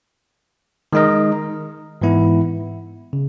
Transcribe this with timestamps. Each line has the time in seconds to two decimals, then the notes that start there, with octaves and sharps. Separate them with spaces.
0.93 D#3 G#3 D#4 A#4 D#5
2.02 G#2 E3 B3 E4
3.13 C#3